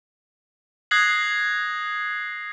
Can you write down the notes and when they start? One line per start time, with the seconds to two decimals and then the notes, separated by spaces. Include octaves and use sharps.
0.91 D#6 F#6 G#6 A#6 C7 F#7